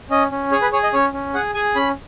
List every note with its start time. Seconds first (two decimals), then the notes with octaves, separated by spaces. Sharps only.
0.10 C#4 D#5
0.31 C#4
0.52 G#4 C#5
0.62 B4
0.73 G#4 C#5
0.83 D#5
0.93 C#4 C#5
1.13 C#4
1.34 G#4 F#5
1.54 G#4 G#5
1.76 C#4 B5